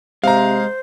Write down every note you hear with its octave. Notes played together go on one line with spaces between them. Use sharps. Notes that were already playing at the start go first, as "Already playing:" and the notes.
C3 G#3 C5 F5 A#5